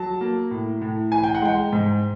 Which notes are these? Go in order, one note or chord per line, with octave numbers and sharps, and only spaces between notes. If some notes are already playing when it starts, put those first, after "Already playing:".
Already playing: F#3 A5
A#3
A2
A2
E3 G#5
G5
F#5
G#3 G5
G#2